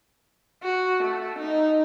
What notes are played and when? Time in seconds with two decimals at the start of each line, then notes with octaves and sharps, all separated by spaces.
0.63 F#4
1.03 A3
1.38 D#4